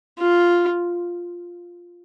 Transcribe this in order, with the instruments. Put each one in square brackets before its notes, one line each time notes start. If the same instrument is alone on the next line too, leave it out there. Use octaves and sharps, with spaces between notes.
[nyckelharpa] F4